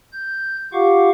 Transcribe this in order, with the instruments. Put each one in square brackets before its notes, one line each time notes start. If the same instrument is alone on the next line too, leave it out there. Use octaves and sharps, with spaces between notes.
[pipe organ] G6
F4 G4 F5 F#5 C#6 D6